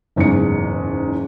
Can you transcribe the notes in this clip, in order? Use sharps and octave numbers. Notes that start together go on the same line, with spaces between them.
F#1 E2 G#2 C#7